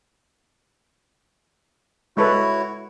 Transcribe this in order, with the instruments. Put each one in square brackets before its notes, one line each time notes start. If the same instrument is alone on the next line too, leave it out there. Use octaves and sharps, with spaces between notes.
[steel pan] G#3 A4 B4 [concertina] E4 F#4 C#5